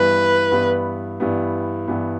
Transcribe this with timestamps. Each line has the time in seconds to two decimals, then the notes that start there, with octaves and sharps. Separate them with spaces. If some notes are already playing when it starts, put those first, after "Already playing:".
Already playing: G2 E3 G3 B3 B4
0.52 G2 E3 G3 B3
1.20 G2 E3 G3 B3
1.88 G2 E3 G3 B3